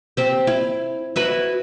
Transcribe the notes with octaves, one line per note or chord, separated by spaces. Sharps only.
C4 G4
E4
E4 F#4 B4